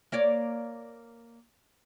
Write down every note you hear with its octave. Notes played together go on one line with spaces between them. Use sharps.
A#3 C#5 D5